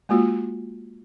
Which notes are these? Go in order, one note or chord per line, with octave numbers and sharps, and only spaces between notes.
G#3 A#3 F4 F#4